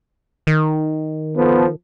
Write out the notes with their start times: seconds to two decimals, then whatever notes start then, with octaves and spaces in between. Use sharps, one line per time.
0.47 D#3
1.36 F3 B3 A4